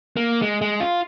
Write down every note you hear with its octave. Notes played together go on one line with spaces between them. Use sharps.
A#3
G#3
G#3
F4